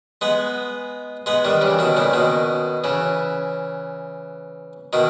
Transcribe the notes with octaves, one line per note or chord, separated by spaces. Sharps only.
G#3 B3
G#3 B3
D#3 G3
C#3 E3
B2 D#3
A#2 C#3
B2 D#3
C#3 E3
B2 D#3